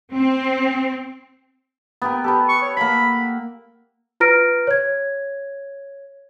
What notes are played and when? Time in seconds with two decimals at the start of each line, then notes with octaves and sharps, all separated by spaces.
0.14 C4
2.02 B3 G4 A#4
2.24 G4 A4 B4
2.49 C#6
2.62 C#5
2.77 A#3 F#5 B5
4.20 F4 B4 A#5 F6 A#6 D7
4.67 C#5 G#6